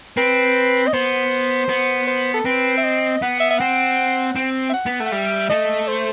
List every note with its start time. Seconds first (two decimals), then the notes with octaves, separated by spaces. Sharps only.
0.17 C4 B4
0.87 D#5
0.93 B3 C5
1.69 B3
2.07 C5
2.34 A4
2.45 C4 B4
2.78 E5
2.84 D#5
3.22 B3 F#5
3.40 E5
3.51 E5
3.59 C4 F#5
4.36 C4
4.70 E5
4.74 F#5
4.86 B3
5.00 A3
5.06 F#5
5.12 G3 E5
5.50 A3 D#5
5.88 C5